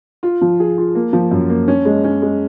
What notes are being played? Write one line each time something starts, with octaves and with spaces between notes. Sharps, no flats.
F4
F3
G#4
F4
A#3
F3
F#2
A#3
C#4
G#3
C#4
G#3